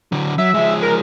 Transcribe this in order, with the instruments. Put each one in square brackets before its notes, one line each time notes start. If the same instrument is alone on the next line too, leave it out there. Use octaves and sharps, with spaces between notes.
[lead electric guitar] D3 F#3
[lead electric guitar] F#3 [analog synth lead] E5
[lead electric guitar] F3 G#3
[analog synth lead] A#4